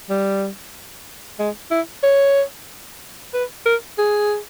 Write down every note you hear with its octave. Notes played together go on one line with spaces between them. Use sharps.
G3
G#3
E4
C#5
B4
A#4
G#4